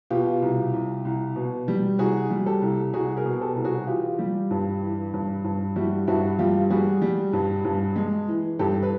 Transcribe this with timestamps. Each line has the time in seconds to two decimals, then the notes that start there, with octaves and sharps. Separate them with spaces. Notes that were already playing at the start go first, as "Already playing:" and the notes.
0.10 B2 F4 G4
0.42 C2
0.73 C2
1.05 C2
1.36 B2
1.68 G3
1.99 C2 F#4 G#4
2.30 G3
2.46 G4 A4
2.62 C2
2.94 C2 F#4 G#4
3.17 G#4 A#4
3.25 B2
3.40 G4 A4
3.56 C2
3.64 F#4 G#4
3.87 E3 F4 G4
4.19 G3
4.51 G2
4.82 E3
5.14 G2
5.44 G2
5.76 G3 E4 F#4
6.08 G2 E4 F#4
6.39 G3 F4 G4
6.70 G3 F#4 G#4
7.02 G3
7.33 G2
7.65 G2
7.96 G#3
8.28 E3
8.59 G2 G4 A4
8.83 B4